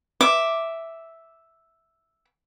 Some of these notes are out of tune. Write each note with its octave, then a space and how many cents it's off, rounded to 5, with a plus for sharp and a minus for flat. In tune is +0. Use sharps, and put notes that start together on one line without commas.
E5 +0 D6 +0